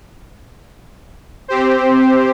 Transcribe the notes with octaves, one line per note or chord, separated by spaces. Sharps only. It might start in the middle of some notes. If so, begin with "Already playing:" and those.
C4 G4 C5